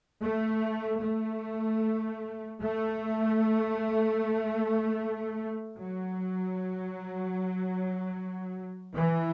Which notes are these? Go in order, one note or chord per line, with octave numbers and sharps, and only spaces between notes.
A3
A3
A3
F#3
E3